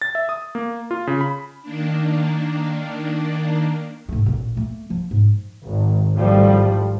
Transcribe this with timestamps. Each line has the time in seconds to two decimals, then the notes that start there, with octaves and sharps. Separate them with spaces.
0.02 A6
0.15 E5
0.29 D#6
0.55 A#3
0.91 F4
1.07 C#3
1.21 B5
1.62 D#3 A#3 D4
4.09 G#2 A3
4.26 A1 A#2
4.56 A3 A#3
4.90 F3
5.11 G#2
5.66 G#1
6.16 G#1 A2 F3 G3